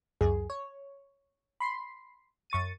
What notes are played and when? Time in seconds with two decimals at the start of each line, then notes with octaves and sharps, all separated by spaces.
0.21 C#2 F#2 G#4
0.50 C#5
1.60 B5 C6 C7
2.50 F#2 C#6 A6 D#7